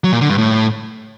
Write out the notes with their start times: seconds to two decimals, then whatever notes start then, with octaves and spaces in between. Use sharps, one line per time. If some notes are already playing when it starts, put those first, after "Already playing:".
0.04 F#3
0.12 A#2
0.21 D3
0.30 G2
0.38 A2